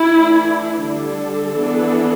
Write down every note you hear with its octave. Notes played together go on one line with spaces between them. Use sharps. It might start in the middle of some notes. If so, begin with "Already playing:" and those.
Already playing: E4
E3 A3 D4
D3 G3 D4 A4
E3 B3 D4